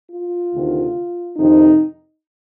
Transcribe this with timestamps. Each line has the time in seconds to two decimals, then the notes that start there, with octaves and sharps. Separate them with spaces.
0.11 F4
0.53 D2 C3 D#3
1.37 F2 C3 D#3 D#4